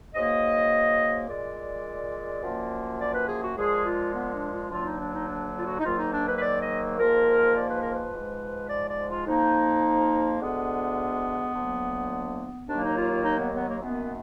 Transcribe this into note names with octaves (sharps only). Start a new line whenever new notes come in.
G#2 F#3 A#3 D#5
A#2 G#3 D5
F#2 F3 A#3
D5
B4
G#4
F#4
A#2 F3 G#3 G#4
F4
B3
D4
F4
D2 D3 F#3 A#3 F4
D#4
D4
D#4
D4
F4
F#4
D#4
G#2 D#3 F#3 A#3 F4
D#4
D4
B4
B4
D5
D#5
G#2 F3 A#3 A#4
D5
B4
A#4
B4
G#2 F3 G#3
D5
D5
F4
F2 F3 A#3 D#4
D2 D3 G#3 B3
D2 D3 F#3 A#3
D#2 D#3 F#3 A#3 D4
D#4
F4
F4
D#4
B3
B3
A#3
F#2 D#3 A#3 B3